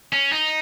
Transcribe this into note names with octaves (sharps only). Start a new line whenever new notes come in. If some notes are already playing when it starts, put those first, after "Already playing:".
C#4
D#4